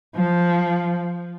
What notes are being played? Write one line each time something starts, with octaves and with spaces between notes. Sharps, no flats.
F3